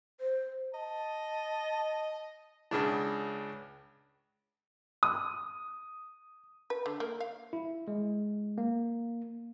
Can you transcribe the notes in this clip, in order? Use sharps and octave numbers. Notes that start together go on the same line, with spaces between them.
C5
D#5 A5
C#2 C#3 D4
D#6
B4
D3
A#3
F5
E4
G#3
A#3